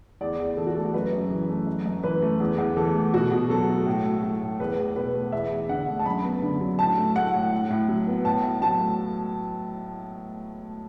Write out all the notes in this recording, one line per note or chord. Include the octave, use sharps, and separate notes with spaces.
E2 D5
E2
E3 A4
F#4
A3 A4
F#4
F#2 B4
F#2
E3
A3
F#2
F#2
E3 B4
A3
E2
E2
E3 A4
A3
B2 F#4
B2
F#3 A4
A3
A2
A3
A3
A2
E2 B4
E2
B2 B4
A3
E2 E5
E2
D3 F#5
A3
A5
F#2 B5
B3
D3
F#3
A2 A5
A3
A3 F#5
A2
A2
A2
F#3
B3
A2 A5
A2
F#3 A5
A3